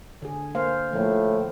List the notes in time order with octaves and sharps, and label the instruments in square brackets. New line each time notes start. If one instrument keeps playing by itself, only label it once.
[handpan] D3 G#4
A#3 C5 F5
[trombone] A2 [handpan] F3 A#3